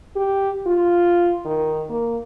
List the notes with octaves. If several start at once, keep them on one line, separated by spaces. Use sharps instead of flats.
G4
F4
D#3
A#3